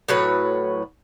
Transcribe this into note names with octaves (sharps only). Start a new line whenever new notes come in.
A2 F#3 B4 C#5